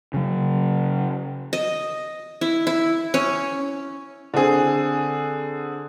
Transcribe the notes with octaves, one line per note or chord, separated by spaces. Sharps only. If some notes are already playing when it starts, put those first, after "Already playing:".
C#3 F#3
D#5
E4
E4
C#4
D3 C4 G#4